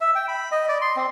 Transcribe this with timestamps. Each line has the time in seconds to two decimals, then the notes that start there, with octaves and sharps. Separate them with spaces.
0.01 E5
0.15 G5
0.28 B5
0.52 D#5
0.69 D5
0.81 C6
0.96 C4